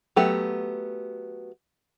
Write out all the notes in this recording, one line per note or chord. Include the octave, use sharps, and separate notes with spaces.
F#3 A3 B3 G4